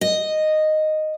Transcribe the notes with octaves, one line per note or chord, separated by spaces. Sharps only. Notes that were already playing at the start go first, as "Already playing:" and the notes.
D#5